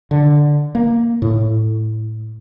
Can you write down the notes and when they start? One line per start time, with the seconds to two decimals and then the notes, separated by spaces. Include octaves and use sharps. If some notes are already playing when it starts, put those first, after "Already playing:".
0.11 D3
0.75 A#3
1.22 A2